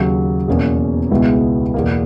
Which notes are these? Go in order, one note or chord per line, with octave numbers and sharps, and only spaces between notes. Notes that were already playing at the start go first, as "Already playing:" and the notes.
Already playing: D#2 C#3 F#3
E2 B2 A#3 C#4
C#2 B2 G#3 B3 E4
E2 B2 A#3